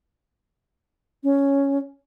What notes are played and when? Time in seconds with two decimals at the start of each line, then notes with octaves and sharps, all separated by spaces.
1.24 C#4